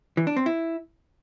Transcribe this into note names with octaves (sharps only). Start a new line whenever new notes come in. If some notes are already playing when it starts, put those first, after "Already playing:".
E3
D4
C4
E4